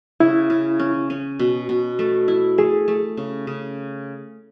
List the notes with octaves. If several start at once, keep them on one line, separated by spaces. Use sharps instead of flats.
C#3 E4
C#3
C#4
C#4
B2
B2
A3
E4
A3 G#4
A3
C#3
C#3